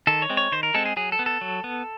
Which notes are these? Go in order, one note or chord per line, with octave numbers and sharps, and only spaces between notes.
D#3 A4
C#5
G#3 C4
C#5
D#3 C5
A#4
G#3 C4 A4
G#4
F#3 G#4
A4
B3
A4
F#3
B3